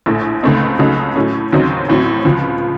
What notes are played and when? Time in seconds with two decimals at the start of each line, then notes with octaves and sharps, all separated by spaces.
0.06 A#1 A2 A3
0.43 C#2 C#3 A3 C4 D#4
0.79 C#2 C#3 F#3 A3 D#4
1.16 A2 F#3 A3 C#4
1.52 D#2 C#3 F#3 C4 D#4
1.89 A1 A2 F#3 C4
2.25 C#2 C#3 F3